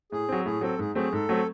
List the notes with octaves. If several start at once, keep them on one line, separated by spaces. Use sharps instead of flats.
A2 G#4
F#3 C4
A2 G#4
F#3 C4 A4
G#2 G#4
F#3 A3 C4 G#4
G#2 A4
F#3 A3 C4